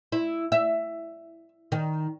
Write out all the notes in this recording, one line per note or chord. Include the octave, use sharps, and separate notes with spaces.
E4
E5
D#3